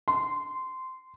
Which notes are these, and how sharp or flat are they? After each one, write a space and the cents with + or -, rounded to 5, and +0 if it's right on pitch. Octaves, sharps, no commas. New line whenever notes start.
C6 -15